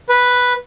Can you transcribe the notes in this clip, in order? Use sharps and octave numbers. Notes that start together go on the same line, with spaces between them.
B4